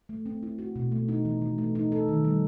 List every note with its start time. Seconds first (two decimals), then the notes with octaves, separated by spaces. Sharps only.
0.09 A3
0.26 C4
0.43 E4
0.59 F#4
0.76 B2
0.92 A3
1.08 D#4
1.25 E3
1.42 E3
1.58 A3
1.75 D#4
1.92 A4
2.08 D#3
2.25 G3